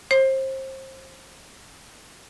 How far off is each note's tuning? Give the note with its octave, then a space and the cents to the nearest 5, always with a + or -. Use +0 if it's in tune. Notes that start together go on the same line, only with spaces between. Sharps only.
C5 +25